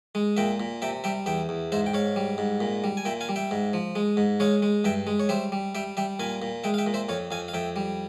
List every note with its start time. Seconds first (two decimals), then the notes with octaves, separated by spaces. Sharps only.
0.15 G#3
0.37 A#2 E5 G5
0.60 A#2
0.82 C3 E5 G5
1.04 G3 E5 G5
1.26 E2 E5 G5
1.49 E2
1.72 G#2 C5 E5
1.86 G5
1.93 G#2 C#5 F5
2.16 G3
2.38 G#2
2.60 A#2
2.84 G3
2.97 G#5
3.05 A#2 E5 G5
3.21 F5 G#5
3.29 G3
3.36 E5 G5
3.51 G#2
3.73 F3
3.95 G#3
4.17 G#2
4.40 G#3 C#5 F5
4.62 G#3
4.84 G2 E5 G5
5.07 G#3
5.20 C#5
5.29 G3 C5 E5
5.52 G3
5.75 G3 E5 G5
5.97 G3 E5 G5
6.19 A#2 F5 G#5
6.42 A#2
6.64 G#3 E5 G5
6.74 F5
6.78 E5 G5
6.86 A#2
6.94 C5 E5
7.09 F2 C#5 F5
7.31 F2 F5 G#5
7.48 F5
7.54 F2 E5 G5
7.76 G3